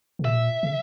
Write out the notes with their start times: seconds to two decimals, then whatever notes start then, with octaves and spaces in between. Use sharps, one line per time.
0.19 C3
0.25 A#2 E5
0.63 C#3